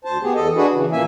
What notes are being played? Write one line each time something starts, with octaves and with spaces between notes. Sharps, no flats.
D2 C5 A5
B3 G4 G#4
E2 A4 D#5
D4 F#4 G#4 B4
C#3 E3
A#2 E3 A#3 E5 G#5